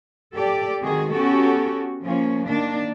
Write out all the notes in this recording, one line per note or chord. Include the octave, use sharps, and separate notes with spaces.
G4 A4 D5
D#3 G#3 C4 F#4 G#4
B3 C#4 F#4 G4 A4
F3 A#3 C#4
D#3 A#3 D4